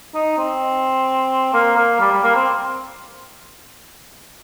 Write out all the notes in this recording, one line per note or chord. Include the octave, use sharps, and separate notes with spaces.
D#4
C4
A#3
A#3
G3
G3
A#3
C4